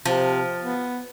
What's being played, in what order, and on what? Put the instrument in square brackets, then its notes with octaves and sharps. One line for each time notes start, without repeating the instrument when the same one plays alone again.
[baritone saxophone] C3 [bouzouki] F3
[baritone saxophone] B3